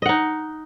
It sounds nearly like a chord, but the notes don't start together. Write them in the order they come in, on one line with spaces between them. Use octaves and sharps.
D#5 F#5 D#4